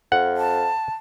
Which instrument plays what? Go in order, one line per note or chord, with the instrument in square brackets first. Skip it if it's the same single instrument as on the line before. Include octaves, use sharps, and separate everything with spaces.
[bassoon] F2 [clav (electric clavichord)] F#5
[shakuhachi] A5